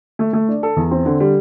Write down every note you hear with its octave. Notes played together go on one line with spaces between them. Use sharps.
A3
A3
D4
A4
E2
C4
D3
G3